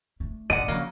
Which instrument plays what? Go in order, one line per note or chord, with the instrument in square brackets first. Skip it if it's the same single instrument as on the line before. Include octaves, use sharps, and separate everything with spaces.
[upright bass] A3 D4
[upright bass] A1 G2 [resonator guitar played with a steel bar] D3 F#5 [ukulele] D5 D#5 [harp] D#7
[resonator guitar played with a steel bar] C#3 F#3 A#3 [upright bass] F3